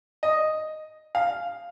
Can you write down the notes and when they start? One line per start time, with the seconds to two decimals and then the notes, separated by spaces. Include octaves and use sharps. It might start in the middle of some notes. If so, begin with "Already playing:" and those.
0.23 D#5
1.15 F5